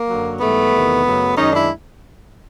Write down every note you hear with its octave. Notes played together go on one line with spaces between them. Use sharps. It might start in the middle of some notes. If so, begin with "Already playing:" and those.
Already playing: A#3
F#2 D3 F#3
G#2 E3 G3 A3 B3
E2 C3 D#3
F#2 C#3 F#3 A3
F#2 D#3 G#3 C#4 D#4
D4 E4